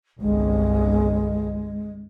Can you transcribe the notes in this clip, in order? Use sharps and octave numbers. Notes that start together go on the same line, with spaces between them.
G1 C2 G#3